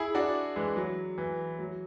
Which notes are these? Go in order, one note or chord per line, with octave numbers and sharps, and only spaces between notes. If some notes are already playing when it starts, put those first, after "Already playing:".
Already playing: E4 G#4
D4 F#4
E3 G#3
F#3
E3
F#3